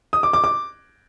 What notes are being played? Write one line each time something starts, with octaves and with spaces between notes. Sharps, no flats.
D#6
D6
D6
D6